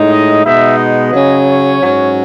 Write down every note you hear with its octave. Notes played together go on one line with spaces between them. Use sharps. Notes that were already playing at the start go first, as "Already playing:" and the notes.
Already playing: A2 G#3 D#4
D#5
B2 G#3 B3 D#4 E5
D#5
C#3 F#3 C#4
C#5
G#2 F#3 C#4